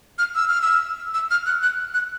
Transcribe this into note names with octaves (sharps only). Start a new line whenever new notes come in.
F6
E6
F6
E6
E6
F6
F#6
F#6
F#6